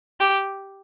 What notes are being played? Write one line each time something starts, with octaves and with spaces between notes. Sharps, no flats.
G4